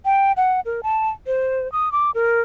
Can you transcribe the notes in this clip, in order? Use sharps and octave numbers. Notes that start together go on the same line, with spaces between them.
G5
F#5
A#4
A5
C5
D#6
D6
A#4